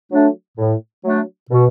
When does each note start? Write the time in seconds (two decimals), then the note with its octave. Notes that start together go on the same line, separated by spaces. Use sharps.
0.12 F#3 A3 D4
0.58 A2
1.04 F#3 A3 D4
1.51 B2